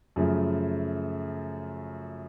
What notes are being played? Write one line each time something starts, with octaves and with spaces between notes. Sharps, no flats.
F#2 C#3 F3 A3